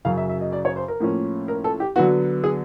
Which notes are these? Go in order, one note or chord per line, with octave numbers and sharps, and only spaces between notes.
F#2 C#3 F#3 F5
E5
E5
D#5
D5
C#5
C5
A#4
A2 F3 A#3 C#4
A#4
A4
G4
D3 F#3 B3 F#4
G#4